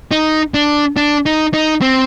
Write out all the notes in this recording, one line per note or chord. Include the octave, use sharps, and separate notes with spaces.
D#4
D4
D4
D#4
D#4
C4